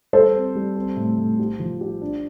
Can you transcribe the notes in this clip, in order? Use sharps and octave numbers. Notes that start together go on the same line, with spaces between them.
G3 A4 C5
C4
G3
C4
A2
A2
G4
F3
G4
D4